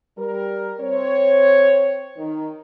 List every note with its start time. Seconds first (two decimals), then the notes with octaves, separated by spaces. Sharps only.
0.17 G3 A#4
0.79 C4 C#5
2.17 D#3